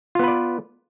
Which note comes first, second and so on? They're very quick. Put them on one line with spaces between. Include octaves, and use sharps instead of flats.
F4 B3 B4 D5